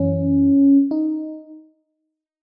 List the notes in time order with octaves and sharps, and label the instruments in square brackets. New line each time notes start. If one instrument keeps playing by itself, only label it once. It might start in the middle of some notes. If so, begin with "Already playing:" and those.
Already playing: [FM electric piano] F#2 E3 C#4
D#4